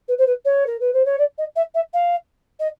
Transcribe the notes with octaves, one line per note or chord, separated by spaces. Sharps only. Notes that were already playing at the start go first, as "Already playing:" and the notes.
B4
C5
B4
C#5
A#4
B4
C5
C#5
D5
D#5
E5
E5
F5
D#5